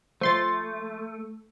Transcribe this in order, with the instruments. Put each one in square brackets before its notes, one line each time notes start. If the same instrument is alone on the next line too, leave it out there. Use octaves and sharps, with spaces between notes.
[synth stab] F3 C6 A6 [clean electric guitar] A3